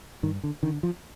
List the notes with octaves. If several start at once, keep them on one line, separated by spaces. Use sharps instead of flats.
G2 D#3
D3
D3 D#3
F3